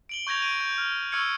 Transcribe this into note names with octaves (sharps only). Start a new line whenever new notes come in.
D7 F#7 G7
C#6 G6 G#6 A#6 F7
D7 D#7
G6
F6
C#6 E6 F6 G#6 C#7 D#7